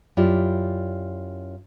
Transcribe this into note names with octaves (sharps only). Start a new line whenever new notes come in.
F#2 E4 F4 G4 D5